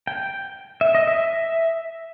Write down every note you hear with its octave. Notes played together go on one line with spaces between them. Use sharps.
G5
E5
D#5
E5